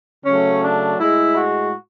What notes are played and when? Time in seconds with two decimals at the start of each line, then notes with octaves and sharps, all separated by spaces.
0.25 C#3 F#3 A3 C#4
0.63 D4
0.99 A2 G#3 E4
1.36 F#4